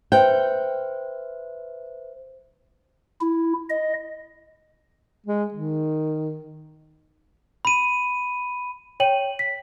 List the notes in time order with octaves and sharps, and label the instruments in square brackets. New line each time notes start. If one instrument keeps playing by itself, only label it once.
[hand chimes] B4 C5 E5 [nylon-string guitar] G5
[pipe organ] E4
D#5
[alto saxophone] G#3
D#3
[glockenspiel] B5 D#7
[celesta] C#5 G5 D#7 F#7
B6